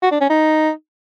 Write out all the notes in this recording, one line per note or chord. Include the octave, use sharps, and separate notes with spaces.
F#4
D4
C#4
D#4